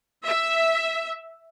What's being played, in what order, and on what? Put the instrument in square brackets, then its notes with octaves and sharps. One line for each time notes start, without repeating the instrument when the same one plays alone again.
[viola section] E5